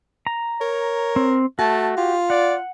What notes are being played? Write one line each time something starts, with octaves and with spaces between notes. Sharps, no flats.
A#5
A#4 C#5
C4
A3 F#4 A5
F4 G4
D5 F#5